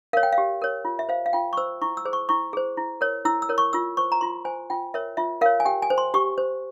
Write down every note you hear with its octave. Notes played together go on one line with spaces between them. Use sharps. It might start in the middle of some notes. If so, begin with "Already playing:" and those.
A#4 C#5 F5
G5
F5
G4
A#4 C#5
F4
E5
C5 F5
F5
F4 G5
C#6
C5 E6
E4 C#6
E6
G#4 C5
C#6
E4 C#6
G#4 C5
E4
A#4 C#5
E4 E6
E6
A#4 C#5
C#6
F4 E6
C5 C#6
A#5
F4 C6
C5 G#5
F4 G5
A#4 C#5 E5
F4 E5
A#4 C#5 F5
G#5
G4 G5
G#5
C5
C6
G4 C#6
C5